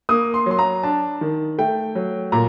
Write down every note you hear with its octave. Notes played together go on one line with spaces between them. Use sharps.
A#3 D#6
C6
F#3 C6
A#5
D4 A5
D#3
A3 G5
F#3
A#2 A#5